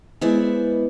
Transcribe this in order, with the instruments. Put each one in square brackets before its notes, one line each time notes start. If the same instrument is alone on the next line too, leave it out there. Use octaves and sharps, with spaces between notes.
[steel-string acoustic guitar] G#3 B3 E4 C5 D5